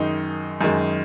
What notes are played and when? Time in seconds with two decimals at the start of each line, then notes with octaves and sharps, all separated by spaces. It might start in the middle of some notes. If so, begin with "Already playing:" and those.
Already playing: F#2 D#3 G#3 D#4
0.61 F#2 D#3 G#3